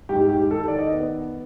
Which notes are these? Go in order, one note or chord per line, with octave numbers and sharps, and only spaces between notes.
G#2 G4
G4
D#3 A4
D5
D#5
B3